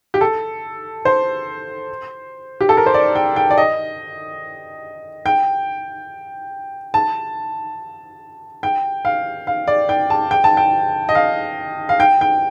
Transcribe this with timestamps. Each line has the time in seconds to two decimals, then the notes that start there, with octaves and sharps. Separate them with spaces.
0.14 G4
0.21 A4
1.05 C5
2.61 G4
2.69 A4
2.77 A#4
2.86 C5
2.94 D5
3.15 G5
3.36 G5
3.50 D5
3.58 D#5
5.26 G5
6.94 A5
8.63 G5
9.05 F5
9.47 F5
9.68 D5
9.89 G5
10.10 A5
10.31 G5
10.44 A5
10.57 G5
11.09 D#5
11.15 F5
11.89 F5
12.00 G5
12.21 G5